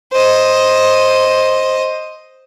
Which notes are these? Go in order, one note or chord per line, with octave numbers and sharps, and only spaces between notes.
C5 D#5